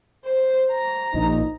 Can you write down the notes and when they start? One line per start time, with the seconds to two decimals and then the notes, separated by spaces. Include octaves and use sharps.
0.25 C5
0.72 A#5
1.14 A#1 D#4